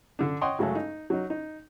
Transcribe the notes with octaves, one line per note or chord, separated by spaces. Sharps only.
D3 D4
C#5 D#5 F#5 G5 C6
C#3 F#3 G#3 A3 A4
D#4
F#3 D#4
D#4